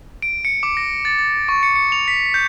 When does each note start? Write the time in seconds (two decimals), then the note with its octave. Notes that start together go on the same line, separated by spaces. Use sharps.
0.22 D7
0.45 C#7
0.63 D6
0.77 A#6
1.05 A6
1.18 A6
1.49 C#6
1.63 C#7
1.76 C#7
1.92 F7
2.08 B6
2.34 G6